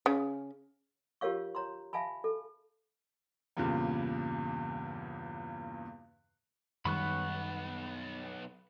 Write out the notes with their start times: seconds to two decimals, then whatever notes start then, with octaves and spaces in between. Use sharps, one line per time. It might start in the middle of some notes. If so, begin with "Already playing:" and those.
0.06 C#3
1.21 F4 G4 A#4 C#5 F5 C#6
1.55 C#5 A#5 C6
1.93 E5 F5 G#5 A5 B5
2.24 A4
3.57 E2 G2 A#2 C#3
6.85 B1 F#2 D#3 G3 B3 B5 C#6 F#6